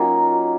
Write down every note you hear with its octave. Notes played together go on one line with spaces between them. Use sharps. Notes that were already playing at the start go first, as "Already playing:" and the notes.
Already playing: F#3 A#3 C#4 D#4 F4